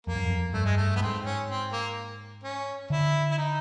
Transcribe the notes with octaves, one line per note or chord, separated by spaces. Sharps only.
F2 A#3
F#2
F2
G2 A3
G#3
A3
G2 B3
G#2 C4
C#4
C4
A#3
C#4
D3 E4
E4
D#4